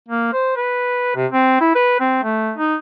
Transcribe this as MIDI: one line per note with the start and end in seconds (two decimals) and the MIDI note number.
0.08 0.33 58
0.33 0.53 72
0.57 1.14 71
1.15 1.26 48
1.32 1.60 60
1.61 1.72 64
1.76 1.96 71
2.00 2.22 60
2.23 2.53 57
2.58 2.76 63